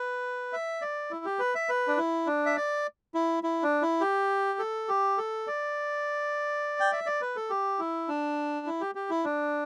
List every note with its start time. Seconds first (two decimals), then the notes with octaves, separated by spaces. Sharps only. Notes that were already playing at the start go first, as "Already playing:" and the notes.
Already playing: B4
0.53 E5
0.82 D5
1.11 E4
1.25 G4
1.39 B4
1.55 E5
1.69 B4
1.88 D4
1.97 E4
2.27 D4
2.46 E5
2.56 D5
3.15 E4
3.43 E4
3.63 D4
3.82 E4
4.01 G4
4.59 A4
4.89 G4
5.18 A4
5.47 D5
6.80 G5
6.92 E5
7.06 D5
7.21 B4
7.36 A4
7.50 G4
7.79 E4
8.08 D4
8.67 E4
8.81 G4
8.95 G4
9.10 E4
9.25 D4